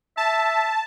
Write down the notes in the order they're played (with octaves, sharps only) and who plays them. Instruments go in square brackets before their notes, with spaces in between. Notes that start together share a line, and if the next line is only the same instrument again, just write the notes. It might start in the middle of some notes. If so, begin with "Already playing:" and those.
[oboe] E5 [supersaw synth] A5